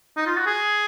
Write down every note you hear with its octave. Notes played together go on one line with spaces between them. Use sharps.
D#4
F4
F#4
G#4